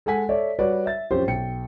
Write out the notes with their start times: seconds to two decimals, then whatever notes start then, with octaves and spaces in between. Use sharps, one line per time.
0.06 G#3 A4 F#5 G#5 B6
0.29 A4 C#5 D5 E5
0.59 G3 F#4 B4 C#5 D5
0.86 E5 A6
1.11 F#2 F3 C4 C#4 G4 C5
1.27 B1 G5 C#7